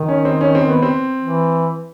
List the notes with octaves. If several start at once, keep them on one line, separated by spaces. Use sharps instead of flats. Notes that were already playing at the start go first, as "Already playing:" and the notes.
Already playing: D#3
C#4
C4
C#4
C4
B3
C4
E3